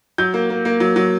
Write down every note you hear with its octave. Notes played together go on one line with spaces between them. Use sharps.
F#3 G6
A#3
A#3
A#3
F#3
F#3